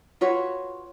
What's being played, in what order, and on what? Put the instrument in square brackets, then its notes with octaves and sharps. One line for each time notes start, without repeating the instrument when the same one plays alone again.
[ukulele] F4 F#4 B4 C#5